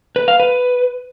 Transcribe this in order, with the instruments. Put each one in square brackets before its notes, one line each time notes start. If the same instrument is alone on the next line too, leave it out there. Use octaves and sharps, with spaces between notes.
[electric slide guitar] B4
F5
B4